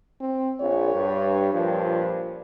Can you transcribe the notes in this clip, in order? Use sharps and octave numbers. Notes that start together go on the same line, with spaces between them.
C4
A#1 C#5
G2
G2 A#2 F3